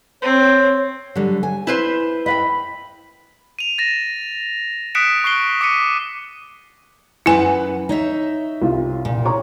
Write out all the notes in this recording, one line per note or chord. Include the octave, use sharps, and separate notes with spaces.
C4 C#5
D3 F#3 G3
G#5
E4 B4 C5
D#5 F5 G5 B5
D#7 F7
A6 A#6 E7
D#6 F#6 B6 C#7 D7 E7
C#6 F#6 C7 G7
D6 B6 C#7 D#7
F#2 E4 B4 F#5 G#5
D#4 C#5 E5
C2 F4
A#2
C#5 A#5 C#6